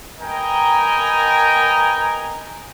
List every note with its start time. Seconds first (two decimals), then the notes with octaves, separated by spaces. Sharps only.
0.19 A#4 B4 D#5 G5 G#5 A#5